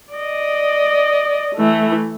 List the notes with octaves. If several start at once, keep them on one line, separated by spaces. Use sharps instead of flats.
D5 D#5
E3 A3